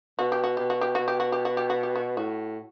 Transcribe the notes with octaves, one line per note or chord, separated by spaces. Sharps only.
B2 F#4
G4
F#4
B2 G4
F#4
G4
B2 F#4
G4
F#4
G4
F#4
G4
F#4
G4
F#4
A2 F#4